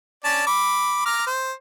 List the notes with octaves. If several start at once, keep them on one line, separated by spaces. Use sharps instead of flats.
C#4 D5 A5
B5 D6
A#5 D6 F6
C5